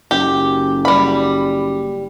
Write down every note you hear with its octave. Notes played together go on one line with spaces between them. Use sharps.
F#1 G4
G3 B5